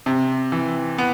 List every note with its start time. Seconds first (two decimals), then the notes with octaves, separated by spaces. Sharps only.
0.06 C3
0.52 E3
0.98 B3